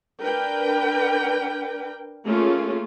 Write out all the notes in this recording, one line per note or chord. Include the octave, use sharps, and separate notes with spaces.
D4 A#4 B4 G5
A3 A#3 C#4 F4 G#4